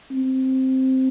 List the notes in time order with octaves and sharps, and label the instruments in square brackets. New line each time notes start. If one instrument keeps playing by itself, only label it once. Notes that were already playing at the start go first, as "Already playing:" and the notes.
[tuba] C4